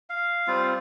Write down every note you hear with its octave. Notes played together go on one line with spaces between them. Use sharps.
F5
G3 C4 F4